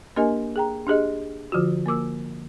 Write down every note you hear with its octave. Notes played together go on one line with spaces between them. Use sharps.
A#3 D4 G4 A#4 D#5 G#5
G#4 G5 A#5
D4 G4 G#4 D#5
D3 F3 F4 F#4
A#3 A#4 D6 E6